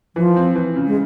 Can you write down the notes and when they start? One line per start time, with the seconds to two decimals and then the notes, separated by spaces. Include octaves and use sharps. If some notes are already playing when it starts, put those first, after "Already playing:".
0.16 E3 F3
0.36 C4
0.55 E3
0.76 C#3
0.87 G#3